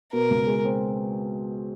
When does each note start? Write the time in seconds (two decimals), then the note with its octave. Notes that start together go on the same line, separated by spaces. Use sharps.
0.13 B2 A#4
0.31 C#2
0.47 G#3
0.65 C4